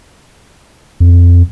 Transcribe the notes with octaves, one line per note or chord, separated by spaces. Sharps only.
F2